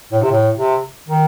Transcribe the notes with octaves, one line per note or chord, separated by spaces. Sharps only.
A2
C3
A2
C3
D#3